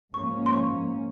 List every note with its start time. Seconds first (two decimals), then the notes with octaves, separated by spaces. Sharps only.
0.13 G#2 F3 A#3 C#4 C#6
0.46 C6
0.53 C#6